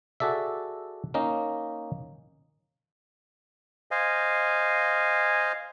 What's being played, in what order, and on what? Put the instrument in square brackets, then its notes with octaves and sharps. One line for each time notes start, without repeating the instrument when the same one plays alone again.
[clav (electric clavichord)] F#4 G#4 A4 D5 E5
A#3 C#4 D#4 D#5
[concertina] C5 D#5 F5 G#5